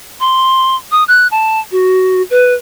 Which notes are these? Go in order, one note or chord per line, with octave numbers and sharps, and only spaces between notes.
C6
D#6
F#6
A5
F#4
B4